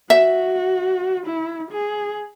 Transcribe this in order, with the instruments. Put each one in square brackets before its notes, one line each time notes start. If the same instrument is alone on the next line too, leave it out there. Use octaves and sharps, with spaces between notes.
[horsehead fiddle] F#4 [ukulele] E5
[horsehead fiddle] E4
G#4